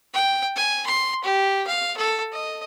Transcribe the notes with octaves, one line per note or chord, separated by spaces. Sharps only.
G5
G#5
C6
G4
F5
A4
D#5